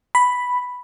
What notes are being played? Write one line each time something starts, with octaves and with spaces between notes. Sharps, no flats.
B5